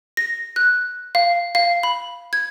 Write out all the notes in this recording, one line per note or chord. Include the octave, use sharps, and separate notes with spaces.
A#6
F#6
F5
F5
B5
G#6